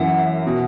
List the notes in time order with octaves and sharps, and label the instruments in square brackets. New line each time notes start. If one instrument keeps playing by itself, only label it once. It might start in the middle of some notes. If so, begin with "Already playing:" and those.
Already playing: [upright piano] F#2 E3 A#3 E4 [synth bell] F#5
[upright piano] B2